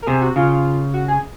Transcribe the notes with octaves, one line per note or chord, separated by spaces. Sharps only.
A#4
C3 G#4
F#4
C#3 F4
F#4
G#4